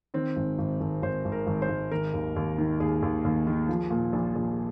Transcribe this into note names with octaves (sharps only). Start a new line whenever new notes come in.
D#3 C4
G#1
G#1
G#1
G#1 C5
G#1
A#4
G#1
C5
G#1
D#3 A#4
D#2
D#2
D#3
D#2 G#4
D#2
D#2
D#3
F3
A#2
A#1
A#1